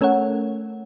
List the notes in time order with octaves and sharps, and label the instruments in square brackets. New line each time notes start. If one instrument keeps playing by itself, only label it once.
[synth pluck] A3 C#4 A4 A#4 C#5 F#5